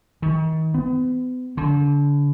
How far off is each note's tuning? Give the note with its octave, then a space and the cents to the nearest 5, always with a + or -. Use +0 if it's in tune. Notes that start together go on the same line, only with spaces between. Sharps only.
D#3 +40
B3 +40
D3 -35